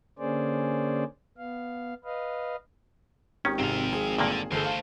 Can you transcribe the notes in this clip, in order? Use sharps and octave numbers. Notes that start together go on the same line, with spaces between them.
D3 A#3 C#4 G#4 C5 D5
B3 F5
B4 D#5 F5
G#1 D#3 C#4 G4
G#2 C3 C4 F5
G#4
G2 A#2 D3 A#3
G1 A3 G#4 A4 C5
F5 A5